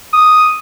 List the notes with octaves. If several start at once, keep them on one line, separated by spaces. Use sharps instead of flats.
D#6